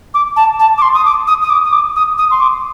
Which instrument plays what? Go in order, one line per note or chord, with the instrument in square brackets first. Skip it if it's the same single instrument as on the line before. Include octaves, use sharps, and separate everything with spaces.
[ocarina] D6
A5
A5
D6
C6
D#6
D6
D#6
D#6
D6
D#6
D6
D#6
D#6
C6
D6